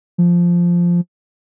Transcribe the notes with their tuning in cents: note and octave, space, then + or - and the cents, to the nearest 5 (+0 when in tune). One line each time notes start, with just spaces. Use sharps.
F3 -5